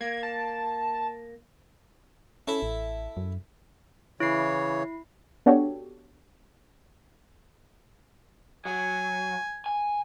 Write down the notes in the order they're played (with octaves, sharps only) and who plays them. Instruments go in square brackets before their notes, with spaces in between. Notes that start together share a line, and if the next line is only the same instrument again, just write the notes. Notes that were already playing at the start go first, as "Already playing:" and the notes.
[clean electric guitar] A#3 [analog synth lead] G#6
[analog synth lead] A5
[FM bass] C#4 [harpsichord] E4 A4 E5
[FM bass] A1
F#2
[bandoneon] C#3 E3 C#5 [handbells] E4 C7
[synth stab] B3 D4 F#4 G4 A4 C#5
[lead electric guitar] F#3 [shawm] G#5
[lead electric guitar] G#5